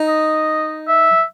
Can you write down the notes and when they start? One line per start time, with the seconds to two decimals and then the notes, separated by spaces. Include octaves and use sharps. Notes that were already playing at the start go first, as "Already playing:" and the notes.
Already playing: D#4
0.08 D#5
0.87 E5